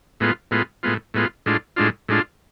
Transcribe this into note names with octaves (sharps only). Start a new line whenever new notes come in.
A2 G#3 B3 F4
A2 G#3 B3 F4
A2 G#3 B3 F4
A2 G#3 B3 F4
A2 G#3 D4 F4
A2 G#3 D4 F4
A2 G#3 D4 F4